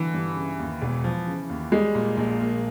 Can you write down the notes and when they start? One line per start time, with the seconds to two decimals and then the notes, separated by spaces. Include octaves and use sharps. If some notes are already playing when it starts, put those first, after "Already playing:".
Already playing: D3 E3
0.14 G2
0.36 C#3
0.59 D#2
0.81 E1
1.04 F3
1.27 C#3
1.49 D#2
1.72 G3 G#3
1.95 A#2
2.17 A#1
2.40 A#3